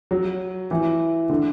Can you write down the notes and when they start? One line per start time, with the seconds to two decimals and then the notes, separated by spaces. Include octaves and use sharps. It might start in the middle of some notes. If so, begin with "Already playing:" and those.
0.11 F#3
0.71 E3
1.29 D3